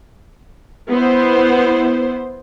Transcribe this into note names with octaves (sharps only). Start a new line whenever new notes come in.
B3 E4 C5